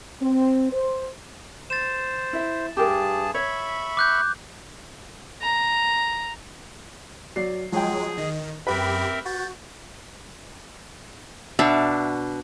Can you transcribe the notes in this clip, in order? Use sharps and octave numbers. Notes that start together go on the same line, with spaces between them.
C4
C5
C5 A6 E7
E4 E5
G2 G4 G#4 A#4 A5
C#5 E5 B5 C#6
D6 F#6 G6
A#5
F#3 D5 C7
F3 F#3 G#3 G#4 G5
D#3 D#5
F#2 C4 G4 A#4 B4 E5 B5
F#4 G6 A6
B2 D4 E5